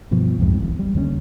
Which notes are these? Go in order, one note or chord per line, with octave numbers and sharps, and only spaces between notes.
G2 B2 F3
C2 F2 G#2 C3
D1 A1
G3
D#2 D3 A#3 C#4